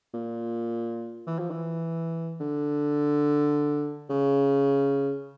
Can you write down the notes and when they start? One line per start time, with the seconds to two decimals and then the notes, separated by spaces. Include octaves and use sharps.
0.14 A#2
1.27 E3
1.39 F3
1.50 E3
2.41 D3
4.10 C#3